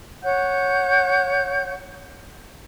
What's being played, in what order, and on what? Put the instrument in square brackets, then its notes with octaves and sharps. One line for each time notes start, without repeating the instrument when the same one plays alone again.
[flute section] C#5 F#5 G6